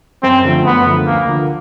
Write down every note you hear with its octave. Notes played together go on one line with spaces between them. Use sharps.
F#2 C4
D3 F3 A3
F#2 B3
D3 F3 A3
D2 A#3
D3 F3